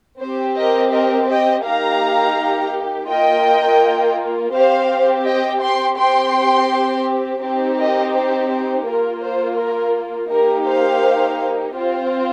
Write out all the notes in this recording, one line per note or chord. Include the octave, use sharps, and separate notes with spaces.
C4 G4 C5
A#4 D#5
A#4 D#5
D#5 G5
A#3 D#4 G4 F5 A#5
A#3 F4 D#5 G5
C4 G4 C5 F5
D#5 G5
G5 C6
C4 G4 G5 C6
C4 D#4 G4
A#4 D#5
C5
C5
A#3 F4 A#4
C5
A#4
A#3 D#4 G4 A#4
C5 F5
C4 F4 C5